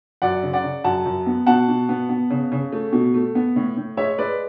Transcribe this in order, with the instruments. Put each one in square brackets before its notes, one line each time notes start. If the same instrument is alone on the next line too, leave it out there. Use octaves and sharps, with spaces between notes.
[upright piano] F#2 D5 F#5
C#3
D5 F#5
C#3
F#2 F#5 A5
F#2
B3
B2 F#5 A5
B2
B3
B3
C#3
C#3
A3
B2
A3
B3
A2
A2
G#3 C#5 E5
G#3 B4 D5